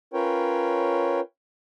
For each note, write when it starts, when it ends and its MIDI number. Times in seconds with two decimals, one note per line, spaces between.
0.14 1.20 61
0.14 1.20 65
0.14 1.20 70
0.14 1.20 71
0.14 1.20 73
0.14 1.20 79